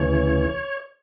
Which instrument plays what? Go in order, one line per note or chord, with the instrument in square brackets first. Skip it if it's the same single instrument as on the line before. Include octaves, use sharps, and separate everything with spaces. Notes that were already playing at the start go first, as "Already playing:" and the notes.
Already playing: [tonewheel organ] D2 C#3 E3 C#5